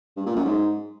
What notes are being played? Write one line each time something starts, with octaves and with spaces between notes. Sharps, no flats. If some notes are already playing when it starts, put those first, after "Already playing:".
G2
A#2
F#2
G#2